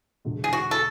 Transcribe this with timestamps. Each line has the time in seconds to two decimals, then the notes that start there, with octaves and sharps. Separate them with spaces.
0.25 E1 E2 D3 G#3
0.44 G#4
0.53 F#4
0.71 A4